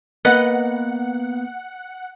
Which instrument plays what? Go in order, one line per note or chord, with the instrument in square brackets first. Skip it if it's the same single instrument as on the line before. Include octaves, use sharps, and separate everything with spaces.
[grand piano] A#3 [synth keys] B3 [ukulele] B4 D#5 [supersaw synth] F#5